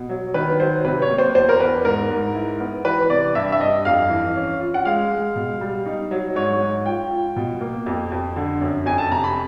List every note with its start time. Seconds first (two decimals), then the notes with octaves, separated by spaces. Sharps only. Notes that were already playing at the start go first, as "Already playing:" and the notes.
Already playing: B2
0.09 F#3
0.34 D#3 B4
0.60 F#3 C5
0.85 C3 B4
1.02 C#5
1.10 A#3
1.18 C5
1.35 E2 C5
1.49 A#4
1.60 E2 B4
1.85 G#2 A#4
2.10 G#2
2.35 E4
2.60 B3
2.85 E3 B4
3.10 C3 D5
3.35 G2 E5
3.52 E5
3.60 G2 D#5
3.85 F2 F5
4.10 E3
4.36 C#4
4.60 F4
4.74 F#5
4.85 G#3 F5
5.11 G#3
5.36 B2
5.61 G3
5.86 D#4
6.11 F#3
6.36 G#2 C#5
6.61 G#2
6.86 F4 G5
7.11 F4
7.36 B2
7.61 A#3
7.86 F2
8.12 F2
8.36 D3
8.61 F#2
8.86 F2 G#5
8.98 A5
9.12 C3 A#5
9.24 B5